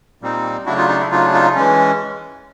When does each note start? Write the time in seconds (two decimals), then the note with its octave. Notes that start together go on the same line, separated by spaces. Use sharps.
0.22 A#2 G3 C4 D#4
0.66 C#3 F#3 A3 D4 E4 F#4
0.78 D#4 F4
0.88 D#4
1.00 E4
1.11 C#3 F#3 A3 D4 D#4 F4
1.33 D#4 F4
1.55 E3 G#3 C#4